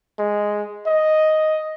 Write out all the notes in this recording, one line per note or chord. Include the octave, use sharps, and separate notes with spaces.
G#3
D#5